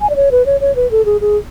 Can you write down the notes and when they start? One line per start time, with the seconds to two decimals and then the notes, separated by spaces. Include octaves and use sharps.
0.01 G#5
0.10 D5
0.16 C#5
0.31 B4
0.46 C#5
0.61 C#5
0.76 B4
0.91 A4
1.05 G#4
1.21 G#4